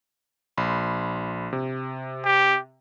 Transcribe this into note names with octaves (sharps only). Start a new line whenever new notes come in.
A#1 B5 C6
C3
G4